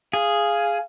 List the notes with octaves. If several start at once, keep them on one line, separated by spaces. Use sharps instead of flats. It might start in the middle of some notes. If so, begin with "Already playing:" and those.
G#4 F5